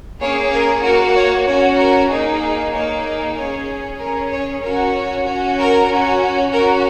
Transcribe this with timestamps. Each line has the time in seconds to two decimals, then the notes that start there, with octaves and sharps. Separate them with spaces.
0.20 A#3 C#4 G#4 C#5
0.52 A#4
0.83 A#3 F#4 A#4
1.15 C#5
1.46 C#4 F#4 C#5
1.78 A#4
2.10 A#3 D#4 G#4
2.73 A#3 D#4 G#4 C#5
3.36 C#4 G#4 C#5
3.99 C#4 G#4 A#4
4.31 C#5
4.62 C#4 F#4 A#4
4.94 C#5
5.25 C#4 F#4
5.57 A#4
5.89 C#4 F#4
6.52 C#4 F#4 A#4